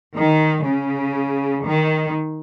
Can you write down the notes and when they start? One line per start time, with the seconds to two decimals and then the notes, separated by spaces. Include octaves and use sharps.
0.14 D#3
0.65 C#3
1.64 D#3